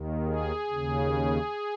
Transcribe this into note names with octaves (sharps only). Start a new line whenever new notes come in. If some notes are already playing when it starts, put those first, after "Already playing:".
Already playing: D#2 D#3
G#4
D#2 C#3